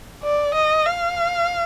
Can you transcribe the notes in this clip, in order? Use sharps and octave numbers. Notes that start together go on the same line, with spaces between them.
D5
D#5
F5